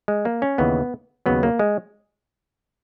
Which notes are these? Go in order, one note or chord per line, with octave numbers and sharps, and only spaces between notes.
G#3
A#3
C#4
D#2 C#3 E3 B3
D#2 C#3 F#3 B3
A#3
G#3